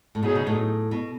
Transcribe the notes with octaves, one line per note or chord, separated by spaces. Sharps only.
A2
B2 F#3 B3 D#4 G#4
C#3
A2
B2